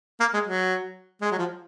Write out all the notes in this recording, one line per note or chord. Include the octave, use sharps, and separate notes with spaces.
A#3
G#3
F#3
G#3
F#3
F3